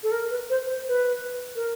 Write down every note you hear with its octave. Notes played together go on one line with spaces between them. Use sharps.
A4
A#4
B4
C5
C5
B4
A#4